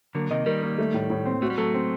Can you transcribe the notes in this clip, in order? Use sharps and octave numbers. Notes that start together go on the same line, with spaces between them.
D3 F#3 A#3
C3 D#3 D#5
D#3 G3 A#4
A#3
A3
A2
A2
C4
A3 F#4
G3
F#3 A3 A4
C4